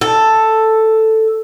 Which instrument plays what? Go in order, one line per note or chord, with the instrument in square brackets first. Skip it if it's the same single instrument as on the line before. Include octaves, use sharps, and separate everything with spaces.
[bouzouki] A4